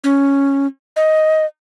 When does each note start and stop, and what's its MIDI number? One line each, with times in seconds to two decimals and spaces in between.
0.04 0.67 61
0.96 1.46 75